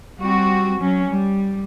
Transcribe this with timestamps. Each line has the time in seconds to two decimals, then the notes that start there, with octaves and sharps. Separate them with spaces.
0.19 G3 C4 F#4
0.79 F#3 C#4
1.09 G3